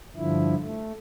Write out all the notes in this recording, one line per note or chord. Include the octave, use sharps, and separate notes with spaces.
G2 D3 F3 E4
A3